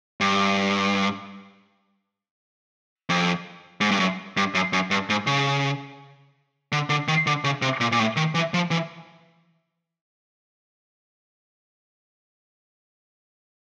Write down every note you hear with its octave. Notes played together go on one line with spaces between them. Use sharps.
G2
F2
G#2
G2
F#2
G2
F#2
F#2
G2
G#2
C#3
D3
D3
D#3
D3
C#3
C3
A#2
A#2
A2
D#3
E3
F3
E3